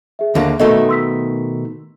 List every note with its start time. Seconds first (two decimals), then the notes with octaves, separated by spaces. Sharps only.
0.19 G#4 E5
0.35 D#2 D3 A#3
0.59 B2 D#3 A3 A4 D#5 E5
0.89 C6 E6 B6